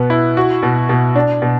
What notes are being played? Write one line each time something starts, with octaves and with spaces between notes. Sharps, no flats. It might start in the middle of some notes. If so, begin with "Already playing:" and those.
Already playing: B2 B3
E4
F#4
B2
B2
D4
B2